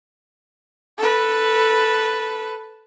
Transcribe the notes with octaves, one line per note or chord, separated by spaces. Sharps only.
A4 B4